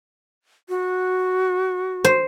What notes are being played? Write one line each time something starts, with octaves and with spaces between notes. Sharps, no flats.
F#4
C5